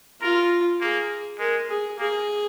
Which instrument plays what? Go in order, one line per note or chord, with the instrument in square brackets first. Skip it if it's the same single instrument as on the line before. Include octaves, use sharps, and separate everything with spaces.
[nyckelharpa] F4 [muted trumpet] A#4
[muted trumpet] A#3 [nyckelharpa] G#4
[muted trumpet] G#3 [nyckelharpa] A#4
[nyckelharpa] G#4
[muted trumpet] A#3 [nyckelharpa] G#4